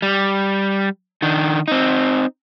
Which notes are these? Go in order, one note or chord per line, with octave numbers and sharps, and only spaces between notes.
G3
D#3 D4
C4 D#4